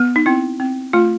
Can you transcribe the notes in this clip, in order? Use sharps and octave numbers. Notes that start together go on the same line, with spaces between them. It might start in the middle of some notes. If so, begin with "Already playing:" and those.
Already playing: B3
D#4
C4 E4
C4
A3 F4